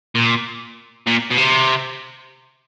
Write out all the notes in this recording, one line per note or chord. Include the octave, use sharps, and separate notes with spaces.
A#2
A#2
B2
C3